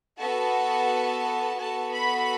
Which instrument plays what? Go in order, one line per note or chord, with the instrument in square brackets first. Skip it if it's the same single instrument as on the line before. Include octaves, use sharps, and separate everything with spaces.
[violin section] B3 F#4 A4 A5
B3 F#4 A4 A5
B5